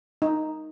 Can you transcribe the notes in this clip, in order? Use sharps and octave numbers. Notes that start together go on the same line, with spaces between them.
D#4